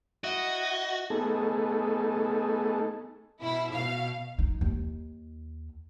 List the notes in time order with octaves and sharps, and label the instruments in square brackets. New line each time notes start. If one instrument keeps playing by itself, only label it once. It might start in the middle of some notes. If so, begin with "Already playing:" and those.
[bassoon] E4 [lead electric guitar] F#4 [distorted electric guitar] D#5
[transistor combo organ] A3 B3 D#4 G#4 A4
[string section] B2 E4
B2 F5
[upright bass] D#4
D#2